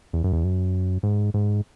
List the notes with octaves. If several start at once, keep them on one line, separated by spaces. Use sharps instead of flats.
E2
F#2
E2
F#2
G#2
G#2